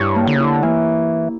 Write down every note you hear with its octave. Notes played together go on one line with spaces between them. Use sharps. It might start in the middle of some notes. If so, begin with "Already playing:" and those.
Already playing: G2 E4 G4 C#5
A#3
D3
C#3
D3 E4
E3 A#3